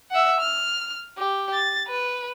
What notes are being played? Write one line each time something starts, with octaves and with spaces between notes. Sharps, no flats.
E5 F#5
F6
G4
A6
B4